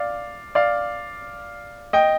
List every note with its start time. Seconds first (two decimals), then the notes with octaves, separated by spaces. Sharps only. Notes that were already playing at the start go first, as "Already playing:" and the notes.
Already playing: D5 F5
0.55 D5 F5
1.93 D#5 G5